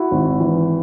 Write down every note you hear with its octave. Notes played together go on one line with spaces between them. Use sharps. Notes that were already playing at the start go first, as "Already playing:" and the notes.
Already playing: E4 F#4
G#1
E3